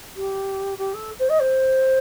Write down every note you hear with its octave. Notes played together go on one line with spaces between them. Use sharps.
G4
G4
A4
C5
D#5
C5